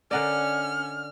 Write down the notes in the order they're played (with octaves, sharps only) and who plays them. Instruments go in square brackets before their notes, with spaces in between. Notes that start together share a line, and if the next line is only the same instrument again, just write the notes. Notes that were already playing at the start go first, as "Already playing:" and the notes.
[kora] D3 A#4 D#5 [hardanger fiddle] C#4 [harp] D5 F#5 [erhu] F6